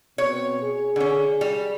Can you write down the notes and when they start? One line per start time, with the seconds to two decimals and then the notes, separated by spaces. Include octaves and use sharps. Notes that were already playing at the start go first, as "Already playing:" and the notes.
0.18 B2 C4 C#5
0.62 G#4
0.96 D3 C#4
1.41 G3